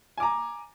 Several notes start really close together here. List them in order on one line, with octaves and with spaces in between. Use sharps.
G#5 D6 A#5